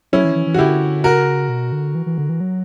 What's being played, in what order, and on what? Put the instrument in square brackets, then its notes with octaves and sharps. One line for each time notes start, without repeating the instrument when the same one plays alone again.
[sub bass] F#3 [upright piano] C#4 E4
[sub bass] E3
E3
E3
[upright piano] F#4
[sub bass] D3 [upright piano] E4 G4
[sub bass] C#3 [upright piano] F#4 A#4
[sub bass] B2
D3
E3
E3
D3
E3
F#3